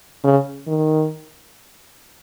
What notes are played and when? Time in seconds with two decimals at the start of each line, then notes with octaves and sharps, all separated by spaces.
0.24 C#3
0.67 D#3